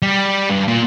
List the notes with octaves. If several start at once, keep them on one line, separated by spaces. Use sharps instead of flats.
G3
G2
A#2